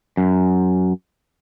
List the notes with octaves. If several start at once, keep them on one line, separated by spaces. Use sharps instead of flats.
F#2